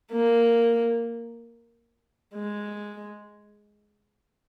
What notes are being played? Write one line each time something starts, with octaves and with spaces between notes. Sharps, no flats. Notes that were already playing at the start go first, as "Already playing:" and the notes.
A#3
G#3